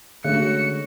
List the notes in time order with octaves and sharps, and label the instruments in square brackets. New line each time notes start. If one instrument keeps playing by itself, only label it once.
[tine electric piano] D3 [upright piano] G#3 C#4 [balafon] A3 [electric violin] F#4 C#7